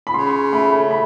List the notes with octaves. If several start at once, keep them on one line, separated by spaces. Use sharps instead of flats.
B5
C#3 C6
A3 B5
B5